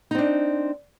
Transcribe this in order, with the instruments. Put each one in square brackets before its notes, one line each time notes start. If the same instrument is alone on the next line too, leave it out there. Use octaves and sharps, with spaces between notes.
[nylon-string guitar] D#4
C4
D4